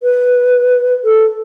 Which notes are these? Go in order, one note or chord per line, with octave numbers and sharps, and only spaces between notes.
B4
A4